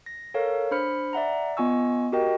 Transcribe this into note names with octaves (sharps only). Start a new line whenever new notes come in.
A#6
A4 A#4 C#5 F5
D4 C5 B5 F6 C#7
D5 E5 F#5 A#5
B3 F4 D#5 G#5 C#6 E6
F#4 G4 A#4 D#5 G5